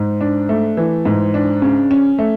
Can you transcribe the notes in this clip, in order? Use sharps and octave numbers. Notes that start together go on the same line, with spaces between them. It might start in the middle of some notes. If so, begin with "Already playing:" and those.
Already playing: G#2
D4
A3
E3
G#2
D4
C#3
C#4
A3